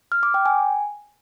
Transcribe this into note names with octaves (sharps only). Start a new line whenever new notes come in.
F6
D6
G5
G#5